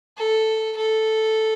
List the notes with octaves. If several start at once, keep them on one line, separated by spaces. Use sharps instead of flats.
A4
A4